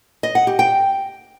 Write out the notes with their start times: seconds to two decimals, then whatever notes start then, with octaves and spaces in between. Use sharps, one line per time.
0.23 D#5
0.35 F#5
0.47 G4
0.59 G5